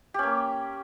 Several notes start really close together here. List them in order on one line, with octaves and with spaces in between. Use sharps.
G4 C#4 A#3